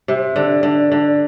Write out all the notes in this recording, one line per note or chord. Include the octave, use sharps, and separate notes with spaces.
C3
D3
D3
D3